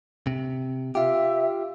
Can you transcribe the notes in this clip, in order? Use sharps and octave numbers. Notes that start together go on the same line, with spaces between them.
C3
F4 G4 E5